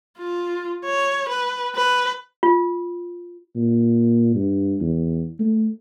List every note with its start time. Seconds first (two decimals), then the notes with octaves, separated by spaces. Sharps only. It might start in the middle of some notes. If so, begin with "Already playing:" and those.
0.19 F4
0.86 C#5
1.29 B4
1.76 B4
2.43 F4
3.56 A#2
4.35 G2
4.80 E2
5.39 A3